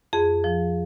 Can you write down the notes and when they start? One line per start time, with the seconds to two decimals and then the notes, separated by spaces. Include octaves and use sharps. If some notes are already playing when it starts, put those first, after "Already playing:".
0.13 F2 G#4
0.44 F3